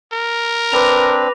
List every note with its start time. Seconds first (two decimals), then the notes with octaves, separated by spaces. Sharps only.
0.13 A#4
0.72 C4 D4 B4 D6 A#6 F7